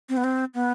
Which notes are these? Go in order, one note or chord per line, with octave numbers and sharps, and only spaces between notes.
C4
B3
C4
B3